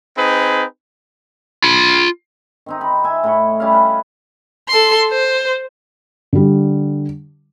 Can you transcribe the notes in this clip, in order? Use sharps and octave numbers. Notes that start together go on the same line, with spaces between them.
C4 D#4 G#4 B4
F4 B5
D#3 C4 D#4
B5
E5 G#5
A2 D#5 B5 C#6
G3 C#4 E5 F5
B4 D#5
A4 C6
C5
D3 G3